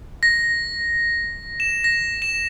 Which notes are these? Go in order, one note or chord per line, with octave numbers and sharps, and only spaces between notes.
A#6
E7
A#6
E7